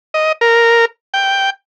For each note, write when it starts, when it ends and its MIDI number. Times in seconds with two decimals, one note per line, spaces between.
0.14 0.32 75
0.41 0.85 70
1.14 1.50 79